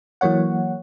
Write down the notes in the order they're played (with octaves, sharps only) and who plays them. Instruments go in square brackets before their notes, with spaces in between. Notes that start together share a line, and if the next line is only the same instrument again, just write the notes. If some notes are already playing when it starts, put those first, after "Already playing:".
[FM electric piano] E3 F#3 A#3 C#5 F#5